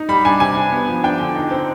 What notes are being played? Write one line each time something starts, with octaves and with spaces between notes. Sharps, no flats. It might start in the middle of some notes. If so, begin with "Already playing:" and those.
Already playing: D#4
G3 B5
D4 G#5
C3 G#5
D4
B3
F3
D4 G5
D3
D#4
C4